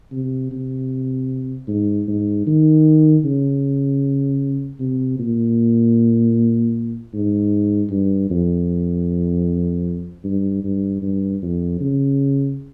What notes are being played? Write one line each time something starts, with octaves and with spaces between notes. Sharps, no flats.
C3
C3
G#2
G#2
D#3
C#3
C3
A#2
G#2
G2
F2
G2
G2
G2
F2
C#3